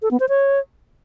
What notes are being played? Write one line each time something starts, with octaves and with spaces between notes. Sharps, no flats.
A4
B3
C5
C#5